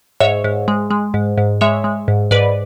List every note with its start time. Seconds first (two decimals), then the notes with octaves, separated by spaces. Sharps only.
0.20 G#2 C#5 E5
0.44 G#2
0.68 G#3
0.91 G#3
1.14 G#2
1.38 G#2
1.61 G#3 C#5 E5
1.84 G#3
2.08 G#2
2.31 G#2 B4 D5